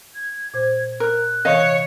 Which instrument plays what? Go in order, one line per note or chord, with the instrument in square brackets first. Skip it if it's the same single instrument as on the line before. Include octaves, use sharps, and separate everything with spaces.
[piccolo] G#6
[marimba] A#2 C5 [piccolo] G#6
[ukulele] A#4 [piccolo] F#6
[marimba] C3 E3 [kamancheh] C#5 [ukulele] D#5 F5